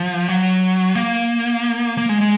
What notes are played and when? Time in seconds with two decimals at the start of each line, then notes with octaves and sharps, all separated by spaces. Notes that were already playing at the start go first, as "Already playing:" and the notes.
Already playing: F3
0.28 F#3
0.95 A#3
1.98 A#3
2.09 G#3
2.21 G#3